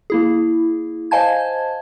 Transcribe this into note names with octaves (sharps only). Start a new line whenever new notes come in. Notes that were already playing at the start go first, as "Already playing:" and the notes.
A#3 E4 G#4
C5 D#5 F5 G#5 A5 G#6